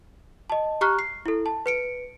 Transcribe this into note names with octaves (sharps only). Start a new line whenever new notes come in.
D#5 A5
G4 A#5 C#6 F6 F#6
C7
E4 A4
A5
B4 C#7 D7